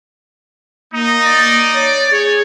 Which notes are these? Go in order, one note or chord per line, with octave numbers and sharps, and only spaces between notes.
A#3 D#4
D5
C#5
G#4 C#5